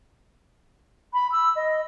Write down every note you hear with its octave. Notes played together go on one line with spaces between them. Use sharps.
B5
E6
D#5